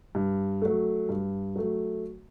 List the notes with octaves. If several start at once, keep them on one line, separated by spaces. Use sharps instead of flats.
G2
F#3 A3
G2
F#3 A3